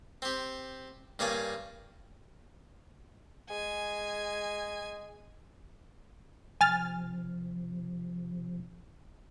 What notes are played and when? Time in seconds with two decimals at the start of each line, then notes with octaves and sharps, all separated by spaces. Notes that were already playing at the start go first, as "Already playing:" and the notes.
0.22 C4 G4
1.19 G2 A#3 C#5 D5 G#5
3.50 G#3 G#5
6.61 C3 F3 G#5 F6 A6